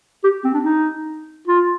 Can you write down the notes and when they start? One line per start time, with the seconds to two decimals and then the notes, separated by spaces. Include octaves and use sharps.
0.24 G4
0.44 C4
0.54 D4
0.65 D#4
1.47 F4